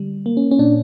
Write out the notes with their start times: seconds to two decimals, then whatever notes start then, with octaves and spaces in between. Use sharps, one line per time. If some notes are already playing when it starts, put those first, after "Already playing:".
Already playing: D3 G3
0.26 A#3
0.37 C#4
0.51 C#4
0.59 A#2 D4